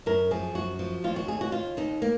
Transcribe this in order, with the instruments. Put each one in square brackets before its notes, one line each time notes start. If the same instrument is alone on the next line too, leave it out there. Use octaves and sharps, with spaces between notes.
[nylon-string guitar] F#2 A#4
F3 G#4
F#2 F#4
F3
D#2 F4
F#4
D#2 G#4
F#4
D#2 F4
D#2 D#4
A#3